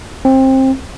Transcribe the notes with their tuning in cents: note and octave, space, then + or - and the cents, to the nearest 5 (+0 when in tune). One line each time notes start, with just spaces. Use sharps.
C4 +20